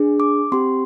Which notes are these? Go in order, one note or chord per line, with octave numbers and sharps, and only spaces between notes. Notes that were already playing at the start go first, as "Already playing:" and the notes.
Already playing: D4 G#4
D6
C4 G4 C6